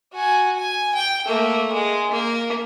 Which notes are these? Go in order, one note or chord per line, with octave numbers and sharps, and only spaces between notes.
F#4 G#5
G#5
G5
A3 A#3
G#3
A#3